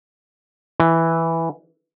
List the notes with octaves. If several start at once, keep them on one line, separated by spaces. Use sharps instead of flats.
E3